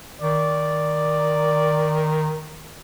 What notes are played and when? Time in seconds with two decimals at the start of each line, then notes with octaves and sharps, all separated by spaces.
0.22 D#3 D5